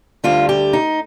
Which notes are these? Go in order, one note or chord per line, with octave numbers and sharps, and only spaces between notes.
D2 D3 G3 F4
G4
D#4